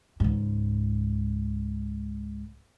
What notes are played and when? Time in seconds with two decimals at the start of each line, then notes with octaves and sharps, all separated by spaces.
0.20 C#2 G#2